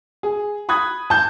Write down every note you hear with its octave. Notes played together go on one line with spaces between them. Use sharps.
G#4
B5 D#6 F#6 G#6
A5 G6